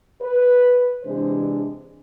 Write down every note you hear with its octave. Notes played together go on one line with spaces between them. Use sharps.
B4
C3 E3 G#3 D4 C5